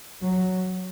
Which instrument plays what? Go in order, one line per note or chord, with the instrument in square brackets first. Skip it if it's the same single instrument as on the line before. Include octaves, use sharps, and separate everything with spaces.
[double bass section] F#3